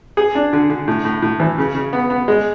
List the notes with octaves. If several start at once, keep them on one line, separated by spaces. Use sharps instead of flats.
G#4
D4
D3
D3
A2
A2
A2
E3
C#3
C#3
B3
B3
G#3